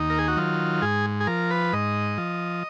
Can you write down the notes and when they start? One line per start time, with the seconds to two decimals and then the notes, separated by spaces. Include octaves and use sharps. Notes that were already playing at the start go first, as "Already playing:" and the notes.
Already playing: D#2 D#4
0.10 A#4
0.19 G#4
0.28 F#4
0.37 D#3 F#3 F4
0.82 G#2 G#4
1.21 G#4
1.27 F3 A#4
1.50 B4
1.73 G#2 D#5
2.18 F3